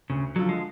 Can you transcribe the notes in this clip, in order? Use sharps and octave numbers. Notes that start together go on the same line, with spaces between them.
D2 C#3
D3 F3 F#3
G#3